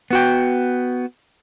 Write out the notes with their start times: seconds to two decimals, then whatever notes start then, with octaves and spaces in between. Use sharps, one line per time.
0.11 B3 F#4 G5